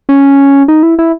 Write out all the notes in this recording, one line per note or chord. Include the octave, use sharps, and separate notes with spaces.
C#4
D#4
E4
E4